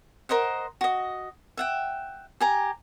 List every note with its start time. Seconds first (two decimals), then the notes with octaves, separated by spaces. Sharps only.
0.29 A#4 C5 D#5 F#5
0.81 F#4 D#5
1.57 E5 F#5 G5
2.40 G4 G#5 A#5